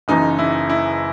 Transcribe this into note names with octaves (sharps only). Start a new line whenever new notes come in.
F#1 F#2 C#3 E3 D#4
E4
E4